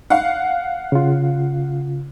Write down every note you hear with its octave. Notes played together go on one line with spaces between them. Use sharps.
F5 F#5
C#3 F4